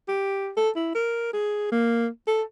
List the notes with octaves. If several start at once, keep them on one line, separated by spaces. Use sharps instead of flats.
G4
A4
E4
A#4
G#4
A#3
A4